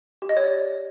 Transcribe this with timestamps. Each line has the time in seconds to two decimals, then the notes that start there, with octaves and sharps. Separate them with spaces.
0.22 G4
0.29 D#5
0.37 C#5
0.44 D5